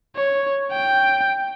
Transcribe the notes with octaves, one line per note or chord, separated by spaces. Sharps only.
C#5
G5